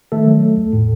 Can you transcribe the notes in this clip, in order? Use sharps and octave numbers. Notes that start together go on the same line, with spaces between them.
D#3 A3 A4
F#3
A3
E2
A2